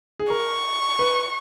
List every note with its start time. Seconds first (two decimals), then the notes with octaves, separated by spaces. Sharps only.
0.19 G#4
0.30 A#4 C#6
0.99 B4